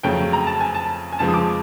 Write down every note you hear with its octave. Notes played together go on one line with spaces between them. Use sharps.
F2 C#3 F#3 A3 G5
A#5
A5
G#5
A5
G#5
F2 C#3 F3 G#3 A5
D#6
D6